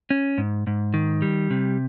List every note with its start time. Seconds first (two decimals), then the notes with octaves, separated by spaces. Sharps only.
0.10 C#4
0.38 G#2
0.67 G#2
0.94 D#3
1.22 G3
1.51 C3